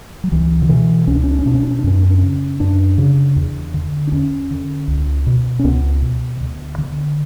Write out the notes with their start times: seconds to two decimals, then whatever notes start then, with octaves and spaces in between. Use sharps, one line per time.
0.24 F#3
0.32 C#2 E3
0.62 D3
0.69 B2 E3
1.07 C#2 C#4
1.16 D4
1.24 C#4
1.31 D4
1.39 C#4
1.46 B2 D4
1.55 C#4
1.63 D4
1.71 C#4
1.79 D4
1.84 F#2 C#4
1.95 D4
2.03 C#4
2.11 D4
2.18 C#3 C#4
2.60 F#2 D4
2.98 C#3
3.36 E2
3.74 D3
4.07 D4
4.12 E2 C#4
4.50 D3
4.88 C#2
5.27 B2
5.59 C#4
5.64 C#2 B3
6.02 B2
6.41 D2
6.78 D3